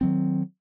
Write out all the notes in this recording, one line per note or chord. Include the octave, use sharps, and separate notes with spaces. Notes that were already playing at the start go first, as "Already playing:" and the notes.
D#3 F#3 C4